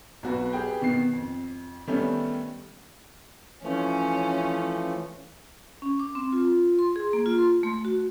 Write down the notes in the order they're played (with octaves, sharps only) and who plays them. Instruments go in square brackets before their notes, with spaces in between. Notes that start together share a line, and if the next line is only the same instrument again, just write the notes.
[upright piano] B1 F#4 B4
G4 G#4 B4 G5
B2 D#3 B3 C7
F2
D#3 G3 A3 B3 C#4
[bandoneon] E3 F3 A3 [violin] C#4
[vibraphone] C#4
D6
C4
F4
C6
G#4
A#3
F4
C6
A3
F#4